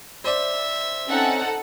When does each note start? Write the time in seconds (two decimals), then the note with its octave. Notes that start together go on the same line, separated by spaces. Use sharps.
0.24 C5 D5 E5
1.08 C4 C#4 D#4 A4 F#5